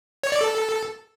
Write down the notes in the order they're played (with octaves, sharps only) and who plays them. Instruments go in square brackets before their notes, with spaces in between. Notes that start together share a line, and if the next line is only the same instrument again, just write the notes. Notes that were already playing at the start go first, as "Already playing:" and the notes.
[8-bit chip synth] C#5
D5
A4